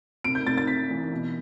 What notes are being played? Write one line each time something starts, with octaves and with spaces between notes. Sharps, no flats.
C3 D7
G6
C3 A6
A6
C3 B6
E3
B2